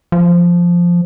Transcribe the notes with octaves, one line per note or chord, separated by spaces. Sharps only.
F3